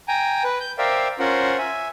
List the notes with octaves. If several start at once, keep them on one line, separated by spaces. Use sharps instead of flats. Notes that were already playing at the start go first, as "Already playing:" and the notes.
G5 G#5 A#5
B4
G6
A#4 C5 D5 E5 F5 G5
C#4 F4 A#4 C5 F#5
E5 G#5